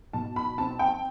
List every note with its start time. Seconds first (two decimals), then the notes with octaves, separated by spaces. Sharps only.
0.13 B2 A5
0.36 B5
0.58 C4 A5
0.79 G5